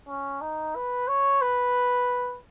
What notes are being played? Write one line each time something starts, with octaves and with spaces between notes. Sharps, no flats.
C#4
D#4
B4
C#5
B4